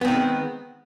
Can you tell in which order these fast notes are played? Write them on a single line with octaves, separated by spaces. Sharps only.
B3 C4 D#3 G#3